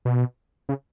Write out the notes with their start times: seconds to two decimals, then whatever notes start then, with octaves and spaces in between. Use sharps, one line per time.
0.05 B2
0.69 C#3